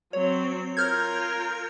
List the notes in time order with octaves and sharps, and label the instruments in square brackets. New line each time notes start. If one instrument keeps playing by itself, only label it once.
[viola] F#3 C4 [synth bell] C#5
[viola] F4 A#4 [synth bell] F6 G6 G#6